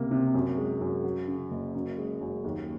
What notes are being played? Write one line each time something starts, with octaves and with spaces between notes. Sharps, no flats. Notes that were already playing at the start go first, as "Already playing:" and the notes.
Already playing: C#2 C3 A#3
C3
F#2
G#3
F#2
F#3
C#3
F#1
F#2
G#3
F#2
D#2